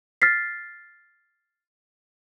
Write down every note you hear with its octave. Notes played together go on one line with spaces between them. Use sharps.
F6 A6 B6 C7